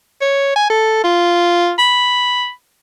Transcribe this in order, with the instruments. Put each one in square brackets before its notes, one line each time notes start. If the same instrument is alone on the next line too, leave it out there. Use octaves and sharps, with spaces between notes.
[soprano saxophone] C#5
G#5
A4
F4
B5